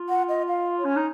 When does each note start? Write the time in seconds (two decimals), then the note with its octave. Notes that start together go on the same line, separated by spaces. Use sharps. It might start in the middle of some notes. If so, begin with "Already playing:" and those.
Already playing: F4
0.09 F#5
0.29 D#5
0.48 F5
0.79 C#5
0.85 C#4
0.96 D#4